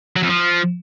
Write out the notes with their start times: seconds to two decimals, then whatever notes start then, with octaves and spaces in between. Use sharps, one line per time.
0.16 F#3
0.23 F2
0.29 F3